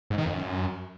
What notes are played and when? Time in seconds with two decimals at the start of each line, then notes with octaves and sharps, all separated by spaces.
0.10 G#2
0.18 D#3
0.25 F2
0.33 F#2